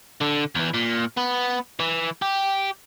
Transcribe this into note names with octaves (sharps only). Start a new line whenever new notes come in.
D3
E2 E3
A#2
B3
E3
G4